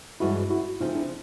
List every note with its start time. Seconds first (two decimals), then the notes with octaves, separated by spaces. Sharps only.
0.20 G2 E3 G#3 C#4 E4 F#4
0.50 E4 F#4
0.81 C#3 F3 A3 C4 D#4 F4
0.95 D4 E4